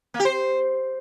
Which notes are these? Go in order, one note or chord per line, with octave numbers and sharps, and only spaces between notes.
A#3
G4
C5